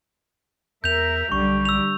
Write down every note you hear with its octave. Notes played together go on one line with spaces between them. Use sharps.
E2 A#4 E5 G6 F7
B1 D3 G3 C#6
E6 F7